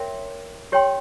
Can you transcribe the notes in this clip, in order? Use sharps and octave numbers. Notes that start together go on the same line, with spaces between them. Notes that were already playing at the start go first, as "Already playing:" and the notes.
Already playing: A#4 C#5 E5 G5 C6
G4 C#5 G5 C6